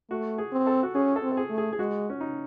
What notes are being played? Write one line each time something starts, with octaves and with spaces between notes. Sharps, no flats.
A3 F#4
G#4
C4
A4
F#4
C#4 G#4
A4
C4
A4
G#4
A3
G#4
G#4
G#3 F#4
C#4
D#4